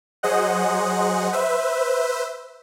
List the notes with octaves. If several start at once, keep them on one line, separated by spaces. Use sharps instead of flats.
F#3 G#4 C5 D#5 F#5
B4 C5 E5